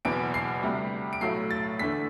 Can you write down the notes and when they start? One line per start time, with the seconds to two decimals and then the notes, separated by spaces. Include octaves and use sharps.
0.05 F#1 E2 B2 D7
0.34 C7
0.63 D2 C3 G3
1.13 D7
1.21 B1 A2 F#3 A3 C7
1.51 A6
1.79 E2 D3 A3 B6